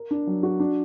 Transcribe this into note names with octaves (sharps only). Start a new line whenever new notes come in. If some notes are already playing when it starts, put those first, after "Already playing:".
Already playing: A#4
D4
F#3
F#4
D4